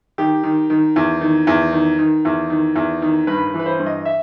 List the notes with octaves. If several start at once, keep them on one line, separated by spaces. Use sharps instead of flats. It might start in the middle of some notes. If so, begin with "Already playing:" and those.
D#3 G4
D#3
D#3
E2
D#3
E2
D#3
D#3
E2
D#3
E2
D#3
G2 B4
B4
E3
B4
C5
G2
D#5
E5